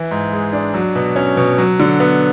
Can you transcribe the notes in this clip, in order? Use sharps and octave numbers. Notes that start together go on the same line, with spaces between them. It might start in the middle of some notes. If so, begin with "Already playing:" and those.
Already playing: E3
G#2
G#3
D4
F#3
B2
C#4
B2
F#3
D3
B3